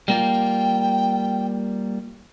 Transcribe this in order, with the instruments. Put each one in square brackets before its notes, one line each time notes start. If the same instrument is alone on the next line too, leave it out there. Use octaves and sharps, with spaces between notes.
[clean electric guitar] G3 A#3 F4 [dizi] G5